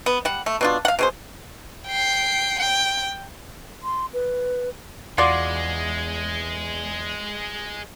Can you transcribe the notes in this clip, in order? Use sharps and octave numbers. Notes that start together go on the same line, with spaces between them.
B3
G3 F#5
A3
B2 D4 F4
F5 F#5
B2 G#4 C5
G5 C7
G5
C6
B4
E2 G#3 F4 F#4 D5